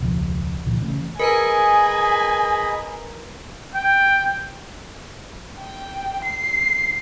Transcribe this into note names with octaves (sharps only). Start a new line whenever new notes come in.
E1 C#2 F3
C#2 A#2 D3 F3
C#3 E3 A3 C#4
G#4 A#4 B4 D#5 G#5 A#5 B5
G5
G5
C7